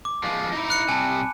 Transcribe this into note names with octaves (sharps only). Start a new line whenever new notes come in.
D6
F3 G#3
D#4 E4
B5 F#6 C#7
C3 G3 G#5 A5